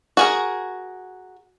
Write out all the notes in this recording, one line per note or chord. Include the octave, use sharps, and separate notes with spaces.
F#4 G#4 A#4